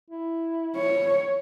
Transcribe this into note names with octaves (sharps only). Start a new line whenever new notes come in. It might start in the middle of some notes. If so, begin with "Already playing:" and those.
E4
C#5